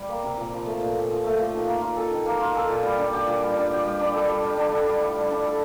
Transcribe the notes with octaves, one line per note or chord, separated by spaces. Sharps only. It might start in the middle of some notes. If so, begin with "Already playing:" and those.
Already playing: G3
A#3
C3
A#2
F3
A3
A#2
A#2
F3
A3
A#2
D#3
A#3
F4
A4
D#3
A#3
F4
A4
A#2
G3
D4
G4
A#2
G3
D4
G4
G3
D4
A4
G3
G3
D4
A4
G3
A2
G3
D4
A4